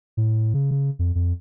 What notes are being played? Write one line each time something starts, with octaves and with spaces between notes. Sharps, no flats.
A2
C#3
C#3
F2
F2